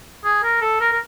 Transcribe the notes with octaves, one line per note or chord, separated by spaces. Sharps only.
G#4
A#4
A4
A#4
A#4